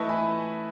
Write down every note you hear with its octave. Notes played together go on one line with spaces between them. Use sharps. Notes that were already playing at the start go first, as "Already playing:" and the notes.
Already playing: E3 A3 E4 B4 D#5 A5 C#6
G#5 B5